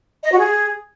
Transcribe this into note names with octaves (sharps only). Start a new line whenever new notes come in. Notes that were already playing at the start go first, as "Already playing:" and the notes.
D#5
F#4
G#4